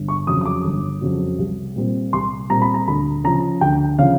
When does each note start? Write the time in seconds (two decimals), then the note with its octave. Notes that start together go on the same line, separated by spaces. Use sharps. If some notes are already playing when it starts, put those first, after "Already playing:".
Already playing: G1
0.08 C#6
0.27 F2 C#3 F#3 D#6
0.41 D#6
0.45 D6
0.64 G1
1.01 F2 C#3 F#3
1.39 C2
1.76 A#2 G3 C4
2.13 C2 C6
2.50 A#2 G3 C4 A#5
2.62 B5
2.74 A#5
2.87 D2 B5
3.24 C#3 F3 A#5
3.61 D2 G5
3.99 C#3 F3 F5